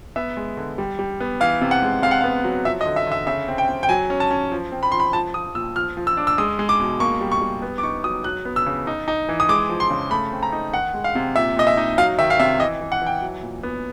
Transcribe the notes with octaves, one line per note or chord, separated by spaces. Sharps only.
B3 E5
G#3
D3
G3
G3
B3
E3 F5
C3
F#5
G#3
C3 F5
F#5
B3 F5
F#3
F3 E5
D#5
D3
E5
D3 E5
C#3 E5
C4
G5
C4
G5
F#3 G#5
C#4
A5
C#4
F3
C4
B5
F3 C6
B5
F3 A5
F3 D#6
A#2 E6
F3 F6
F3
E6
D4
E6
G#3 D#6
G#3
D6
B2
A#3 C#6
G3
C#6
G3
B3
D6
D#4 C#6
F#3 D#6
F#3 F#6
B3
E6
C#3
D#4
D#4
E3
D#6
G#3 D6
F3
C6
C#3
A3 B5
C4
A#5
D#4
D#3 F#5
G#3
F5
C3
A#2 E5
A#2 D#5
E5
D#4
F#3 F5
D#3 E5
F5
C3 E5
E3 D#5
E3
F#5
E3 G5
F#3
A#2
B3